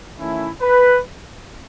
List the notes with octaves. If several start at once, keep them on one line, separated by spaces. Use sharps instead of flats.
D#3 A3 C#4 E4
B4